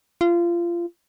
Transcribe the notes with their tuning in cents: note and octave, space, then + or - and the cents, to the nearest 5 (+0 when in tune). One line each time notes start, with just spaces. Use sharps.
F4 -25